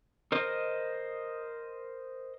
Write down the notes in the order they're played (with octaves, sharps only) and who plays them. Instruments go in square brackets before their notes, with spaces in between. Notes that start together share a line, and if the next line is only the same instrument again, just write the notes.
[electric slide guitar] A#4 C5 D#5